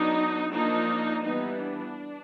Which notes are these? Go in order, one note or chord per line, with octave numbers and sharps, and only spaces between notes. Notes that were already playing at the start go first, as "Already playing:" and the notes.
Already playing: F#3 B3 D4 D#4
F3 A#3 D4 D#4
E3 G3 B3 D#4
D4